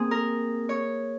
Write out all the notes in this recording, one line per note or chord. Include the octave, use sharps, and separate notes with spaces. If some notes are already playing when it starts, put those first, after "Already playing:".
Already playing: A#3 C4 G#4
A#4
C#5